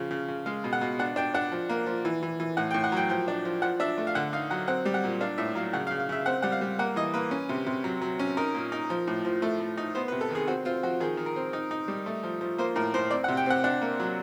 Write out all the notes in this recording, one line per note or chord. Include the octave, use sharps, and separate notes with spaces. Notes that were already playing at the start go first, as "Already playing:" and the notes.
Already playing: C#3 F3
C#3
C#3
G#3 F5
B2
F#5
B2
D4 F#5
D4 G5
D4 F#5
F3
A#3
F3
E3
E3
E3
A2 F#5
G5
A2
F#5
F#3 G5
F3 G5
D4
F3
F3 F#5
D4 E5
A3
F5
D3 F#5
D#4 F5
F#3 F#5
C4 F#5
G3
F#5
A#2
D4 F5
A2 E5
F#3 F5
C#3 F#5
F5
C#3
F5
C#3 E5
C4 F#5
G3 F#5
F5
G3
A#3 F#5
E3 D#5
A#3 B4
C#4
C3
C3
F#3
F#3
C#4
D#4 A#4
A#2
D#4
F3
A2
F3
A3
A3
D#4
B3 C5
B4
C3
A4
D#3 G#4
C4 F#4
C4 F4
F3 F#4
D#3 G#4
D#3
A#4
C4
D#4
D#4
G3
A3
F3
F3
A#3 C5
A2 A#4
A2 C5
C4 D5
F#5
C3
G5
C4 F#5
D4 F#5
A#3
F#3